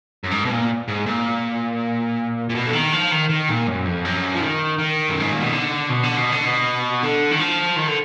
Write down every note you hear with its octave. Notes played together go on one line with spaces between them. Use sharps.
F#2
G#2
B2
A#2
G#2
A#2
A#2
B2
D3
D#3
F3
D#3
D#3
A#2
F#2
F2
F#2
F3
D#3
D#3
F#2
G#2
A#2
B2
D3
B2
D3
B2
D3
B2
D3
D#3
F3
D#3
D3